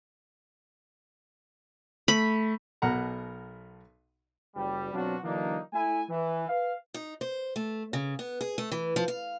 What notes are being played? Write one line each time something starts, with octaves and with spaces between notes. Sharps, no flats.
A3 B5
B1 B2 A#4 F#5 A#5
F#1 G3
B2 F#3 C4 D4 F4 F#4
D3 E3 F#3 A#3 D4 D#4
A3 E4 G#5
E3
B4 F5
D#4
C5
A3
C#3
B3
G#4
A3
E3
F3
F5